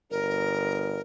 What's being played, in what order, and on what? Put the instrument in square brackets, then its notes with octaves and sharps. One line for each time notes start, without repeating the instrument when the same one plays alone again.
[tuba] G1 [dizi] A#4